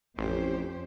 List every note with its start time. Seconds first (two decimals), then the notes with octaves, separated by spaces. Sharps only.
0.18 A1 F2 C#4 G4 C5